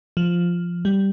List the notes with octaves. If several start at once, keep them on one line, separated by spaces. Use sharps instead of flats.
F3
G3